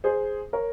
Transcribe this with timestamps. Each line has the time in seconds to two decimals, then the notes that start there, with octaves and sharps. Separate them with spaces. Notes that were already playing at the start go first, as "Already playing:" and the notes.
0.04 G#4 C5
0.53 A#4 C#5